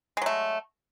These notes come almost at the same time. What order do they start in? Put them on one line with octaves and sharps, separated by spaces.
G#3 F#3 A3